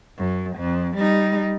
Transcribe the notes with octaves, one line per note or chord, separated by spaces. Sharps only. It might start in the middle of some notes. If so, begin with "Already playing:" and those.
F#2
F2
G3 D#4